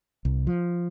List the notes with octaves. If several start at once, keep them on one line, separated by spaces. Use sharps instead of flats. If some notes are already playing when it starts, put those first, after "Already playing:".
C2
F3